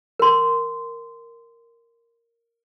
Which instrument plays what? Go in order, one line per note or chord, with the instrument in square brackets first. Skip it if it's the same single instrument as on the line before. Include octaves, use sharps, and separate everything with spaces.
[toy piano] A#4 C6